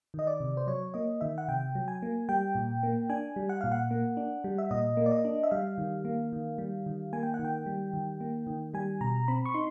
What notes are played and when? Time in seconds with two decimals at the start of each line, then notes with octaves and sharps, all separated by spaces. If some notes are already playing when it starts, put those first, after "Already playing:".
0.14 D#3 D#5
0.27 D5
0.40 C3
0.57 C5
0.67 F#3 C#5
0.94 A#3 D#5
1.21 D#3 E5
1.38 F#5
1.48 C3 G5
1.75 F#3
1.88 G#5
2.02 A#3
2.29 G3 G5
2.55 A#2
2.83 A#3
3.09 D4 G#5
3.36 G3
3.49 F#5
3.61 A#2 F5
3.72 F#5
3.91 A#3
4.17 D4
4.44 G3
4.58 E5
4.71 A#2 D#5
4.97 A#3
5.06 D5
5.12 D#5
5.25 D4
5.43 E5
5.51 G3 F5
5.78 D#3
6.05 A#3
6.33 D#3
6.58 G3
6.86 D#3
7.13 A#3 G#5
7.23 G5
7.34 F#5
7.39 D#3
7.44 G5
7.66 G3
7.93 D#3
8.21 A#3
8.47 D#3
8.74 G3 G#5
9.01 B2 A#5
9.28 C4 B5
9.45 C#6
9.54 D#4 C6